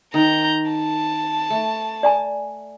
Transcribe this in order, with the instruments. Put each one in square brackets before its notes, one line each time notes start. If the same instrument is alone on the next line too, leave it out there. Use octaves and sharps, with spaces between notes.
[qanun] D#3 [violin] A#5 G6
[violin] A5
[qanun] A3
[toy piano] D5 G#5 A#5